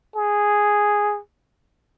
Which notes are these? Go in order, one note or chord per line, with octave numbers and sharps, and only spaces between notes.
G#4